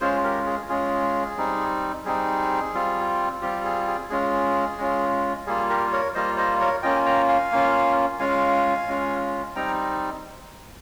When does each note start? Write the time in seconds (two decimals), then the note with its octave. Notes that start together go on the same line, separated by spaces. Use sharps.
0.01 G#3 C#4 F4 G#4 C5
0.24 G4 A#4
0.46 G#4
0.69 G#3 C#4 F4 G#4
1.37 G3 C4 D#4
2.05 G3 C4 D#4 G#4
2.74 G3 C4 F4
3.42 G3 C4 F4 G4
3.65 G#4
3.87 G#4
4.10 G#3 C#4 F4 G#4
4.78 G#3 C#4 F4
5.46 G3 A#3 F4 G#4
5.70 G4 A#4
5.92 A#4 C#5
6.15 G3 A#3 F4 C5 D#5
6.37 C5 D#5
6.60 A#4 C#5
6.83 A#3 C#4 F4 D#5 G5
6.96 G#5
7.06 G5 A#5
7.29 F5 G#5
7.52 A#3 C#4 F4
8.19 G#3 C#4 F4 F5 G#5
8.88 G#3 C#4 F4
9.56 G3 C4 D#4 G5 A#5